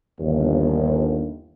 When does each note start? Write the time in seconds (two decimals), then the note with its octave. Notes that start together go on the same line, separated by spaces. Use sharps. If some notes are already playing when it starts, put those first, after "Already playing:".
0.20 G1 D#2